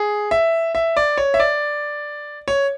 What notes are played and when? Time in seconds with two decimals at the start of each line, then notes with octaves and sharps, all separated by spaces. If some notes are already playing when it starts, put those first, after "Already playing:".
Already playing: G#4
0.31 E5
0.75 E5
0.96 D5
1.18 C#5
1.34 E5
1.40 D5
2.48 C#5